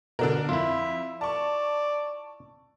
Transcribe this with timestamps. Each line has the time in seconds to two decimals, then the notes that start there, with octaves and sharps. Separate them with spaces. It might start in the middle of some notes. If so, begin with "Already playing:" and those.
0.19 B2 D3 D4 A#4
0.49 F2 E4 F4 E5
1.21 D5 A5 C#6